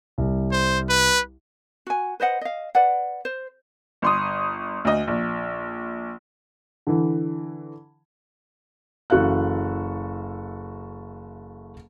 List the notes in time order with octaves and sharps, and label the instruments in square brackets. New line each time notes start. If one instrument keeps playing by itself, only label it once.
[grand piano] C2
[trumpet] C5
B4
[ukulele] F#4 G#5
B4 C5 D#5 F#5
D#5 F5
B4 D5 F#5
C5
[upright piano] G1 C6 D#6
D2 D#5
A#1
D3 E3
[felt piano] F#1 E3 F#4 A4 F5 F#6